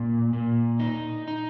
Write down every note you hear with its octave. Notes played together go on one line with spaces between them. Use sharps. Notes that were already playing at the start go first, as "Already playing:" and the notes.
Already playing: A#2
A#2
D#4
D#4